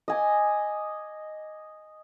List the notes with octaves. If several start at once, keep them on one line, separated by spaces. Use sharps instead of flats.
D#5 G#5 D6